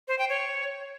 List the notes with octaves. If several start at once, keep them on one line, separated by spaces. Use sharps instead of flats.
C5
G5
C#5